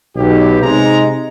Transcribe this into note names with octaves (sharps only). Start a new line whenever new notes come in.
B1 G4
C3 G#3 D#4 A#5